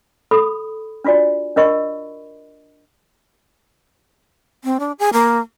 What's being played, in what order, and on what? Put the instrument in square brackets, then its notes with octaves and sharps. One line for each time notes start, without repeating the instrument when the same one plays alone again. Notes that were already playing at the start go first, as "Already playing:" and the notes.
[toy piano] A4 B5 D#6
D4 F4 F#4 D5 G#5
D4 A#4 D#5 B5 C#6
[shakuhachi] C4
D4
G#4
A#3